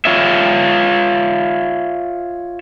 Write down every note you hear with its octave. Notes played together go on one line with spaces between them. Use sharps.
F4 C#5 E5